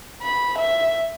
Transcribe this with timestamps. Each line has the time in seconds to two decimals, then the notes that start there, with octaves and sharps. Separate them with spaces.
0.23 B5
0.59 E5